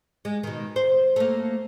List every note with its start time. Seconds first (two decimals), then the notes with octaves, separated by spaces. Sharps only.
0.25 G#3
0.43 B2 D#3
0.76 C5
1.16 A3 A#3